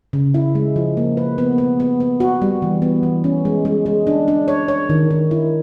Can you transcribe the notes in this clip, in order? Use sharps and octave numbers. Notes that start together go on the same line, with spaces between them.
C#3
E4
G#3
F3
A#3
B4
B3
B3
B3
B3
F#4
G3
E3
B3
E3
C#4
G#3
G#3
G#3
D4
D4
C#5
C#5
D#3
D#3
E4